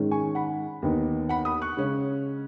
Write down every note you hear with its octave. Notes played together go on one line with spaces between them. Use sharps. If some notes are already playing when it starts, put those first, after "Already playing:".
Already playing: G#2 D#3 G#3 C#4
G#5 C#6
F#5 B5
D#2 D#3 B3 D#4
F#5 B5
B5 D#6
C#6 F#6
C#3 G#3 C#4